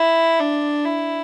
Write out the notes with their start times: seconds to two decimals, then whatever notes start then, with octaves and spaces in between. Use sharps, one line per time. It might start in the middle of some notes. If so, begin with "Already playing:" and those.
Already playing: E4
0.40 D4
0.85 E4